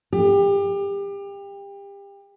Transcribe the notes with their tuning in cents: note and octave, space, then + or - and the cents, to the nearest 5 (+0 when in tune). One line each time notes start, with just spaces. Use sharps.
G4 +30